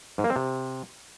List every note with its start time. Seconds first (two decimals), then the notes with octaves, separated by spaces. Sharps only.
0.18 G#2
0.24 A#3
0.30 C4
0.36 C3